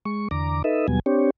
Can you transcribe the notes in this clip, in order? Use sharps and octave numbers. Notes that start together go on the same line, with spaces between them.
G#3 C#6
E2 D3 A#5 D6
D#4 A4 B4 D#5 E5
D#2 B2 F#3 G3 B3 G#5
C4 D4 G4 C#5